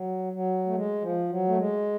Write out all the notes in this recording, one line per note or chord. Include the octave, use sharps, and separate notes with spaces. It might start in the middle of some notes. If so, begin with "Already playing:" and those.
Already playing: F#3
F#3
A3
G#3
F3
F#3
A3
G#3